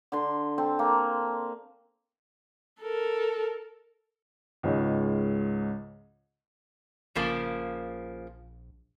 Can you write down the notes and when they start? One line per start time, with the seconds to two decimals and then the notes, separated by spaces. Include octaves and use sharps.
0.12 D3 C6
0.58 C4 A4
0.79 A#3
2.81 A4 A#4
4.63 C#2 G#2 C#3 G#3 C#4
7.15 A#1 C#3 F3 A#3